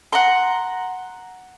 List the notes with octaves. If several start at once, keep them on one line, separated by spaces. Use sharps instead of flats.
F#5 A#5 C6